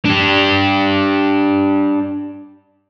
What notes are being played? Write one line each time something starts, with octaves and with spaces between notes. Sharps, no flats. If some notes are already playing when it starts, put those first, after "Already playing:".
D4 G4